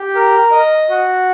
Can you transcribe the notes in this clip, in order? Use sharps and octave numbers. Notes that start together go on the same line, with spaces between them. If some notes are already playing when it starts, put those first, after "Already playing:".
Already playing: G4
A#4
D#5
F#4